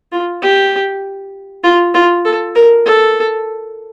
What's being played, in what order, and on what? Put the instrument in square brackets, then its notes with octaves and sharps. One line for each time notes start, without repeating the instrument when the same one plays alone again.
[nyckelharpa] F4
G4
F4
F4
A4
A#4
A4